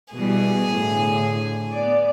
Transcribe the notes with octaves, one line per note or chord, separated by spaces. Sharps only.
B2 E3 G3 G#4 G#5
A2 D3
B3 D5